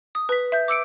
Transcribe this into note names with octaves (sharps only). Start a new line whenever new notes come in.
D#6
B4 B6
E5 G6
D6 E6 C#7 D7